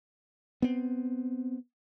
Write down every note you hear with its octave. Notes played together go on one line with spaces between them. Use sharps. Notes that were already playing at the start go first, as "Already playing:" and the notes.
B3 C4